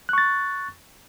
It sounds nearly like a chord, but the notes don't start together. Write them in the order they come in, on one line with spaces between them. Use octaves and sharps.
F#6 C#6 A6